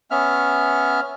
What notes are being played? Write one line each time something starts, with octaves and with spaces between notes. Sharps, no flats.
B3 C#4 E5 F6